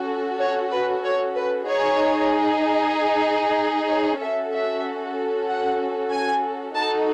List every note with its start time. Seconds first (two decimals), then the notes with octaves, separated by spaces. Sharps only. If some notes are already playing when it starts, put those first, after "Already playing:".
Already playing: C#4 F#4 A4
0.39 C#5
0.71 B4
1.03 C#5
1.35 B4
1.66 D#4 G#4 C#5
3.90 C#5
4.21 C#4 F#4 A4 E5
4.53 E5
5.49 F#5
6.12 G#5
6.75 D#4 F#4 A4 A5